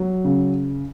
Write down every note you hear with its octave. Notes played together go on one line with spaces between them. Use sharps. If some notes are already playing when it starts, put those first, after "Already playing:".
Already playing: F#3
C#3